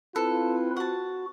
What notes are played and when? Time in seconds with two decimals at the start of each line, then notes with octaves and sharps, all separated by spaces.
0.16 C4 E4 F4 A4 B4
0.77 F#4 F#5 A5